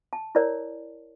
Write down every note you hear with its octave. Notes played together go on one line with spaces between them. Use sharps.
A5
E4 A#4 C#5 D5